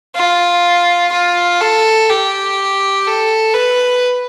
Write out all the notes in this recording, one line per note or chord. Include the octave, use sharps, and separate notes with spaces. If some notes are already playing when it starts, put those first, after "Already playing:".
F4
F4
A4
G4
A4
B4